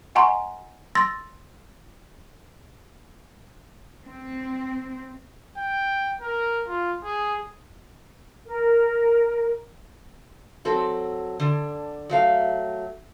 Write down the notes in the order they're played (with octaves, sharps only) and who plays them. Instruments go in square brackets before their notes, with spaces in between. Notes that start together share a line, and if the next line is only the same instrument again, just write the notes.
[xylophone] D#5 F#5 G#5 A#5 C6 C#6
C6 E6 A6 A#6
[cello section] C4
[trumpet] G5
A#4
F4
G#4
[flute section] A#4
[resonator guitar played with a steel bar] F#3 C4 A4
D3 D4
F#3 A3 F5